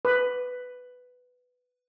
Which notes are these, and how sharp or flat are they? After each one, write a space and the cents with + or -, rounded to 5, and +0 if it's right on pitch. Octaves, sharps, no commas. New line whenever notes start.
B4 +10